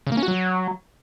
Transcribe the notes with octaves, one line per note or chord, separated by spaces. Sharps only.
C#3
A#3
C#4
F#4
F#3